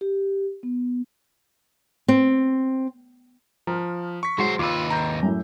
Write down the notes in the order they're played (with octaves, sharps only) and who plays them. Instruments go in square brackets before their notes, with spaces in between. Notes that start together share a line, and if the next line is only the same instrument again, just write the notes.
[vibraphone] G4
B3
[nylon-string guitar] C4
[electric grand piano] F3 [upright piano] A#5 F6
[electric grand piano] C#6 B6
[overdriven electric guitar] F#3 C5 [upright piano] G#3 F#4 [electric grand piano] C6
[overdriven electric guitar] D#2 B4 [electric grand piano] F4 E6 [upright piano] D6
[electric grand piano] A#5 G6
[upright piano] F#2 A2